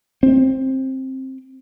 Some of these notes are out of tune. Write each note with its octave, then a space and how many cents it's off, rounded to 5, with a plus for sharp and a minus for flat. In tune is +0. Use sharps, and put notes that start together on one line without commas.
C4 +15